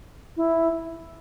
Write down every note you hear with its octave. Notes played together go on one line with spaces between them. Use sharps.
E4